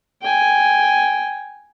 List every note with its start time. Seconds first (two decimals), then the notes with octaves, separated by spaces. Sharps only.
0.21 G5 G#5